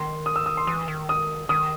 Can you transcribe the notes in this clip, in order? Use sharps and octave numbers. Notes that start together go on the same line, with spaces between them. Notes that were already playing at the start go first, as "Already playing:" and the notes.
Already playing: D#3 C6
D#6
E6
D#6
C6
E3 D#6
D#3
D#6
D#3 D#6